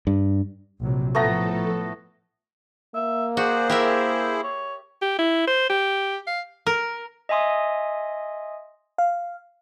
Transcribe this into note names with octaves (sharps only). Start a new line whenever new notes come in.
G2
A#1 C3 F#3
A2 F3 A3 B3 A4 A#5
A#3 E5
F#4 G#4 C5 D5
E4 G4 A#4 E5
C#5
G4
E4
C5
G4
F5
A#4
D#5 E5 G#5 C6 D#6
F5